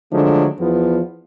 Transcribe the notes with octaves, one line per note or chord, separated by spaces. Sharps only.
D3 F3 F#3 G#3 A3 D4
E2 F3 B3